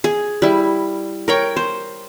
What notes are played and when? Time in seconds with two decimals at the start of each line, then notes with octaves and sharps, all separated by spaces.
0.04 G#4
0.42 G3 E4
1.28 A#4 C#5 G5
1.56 C5